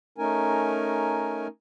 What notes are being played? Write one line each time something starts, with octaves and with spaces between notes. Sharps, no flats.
A3 C#4 D#4 A#4 G#5